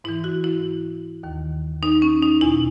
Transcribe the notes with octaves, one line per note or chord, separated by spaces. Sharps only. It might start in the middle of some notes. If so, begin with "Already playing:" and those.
G#2 E3 E4
F#4
E4
D#2 D#3
D#4
C#4
D#4
E2 B2 E4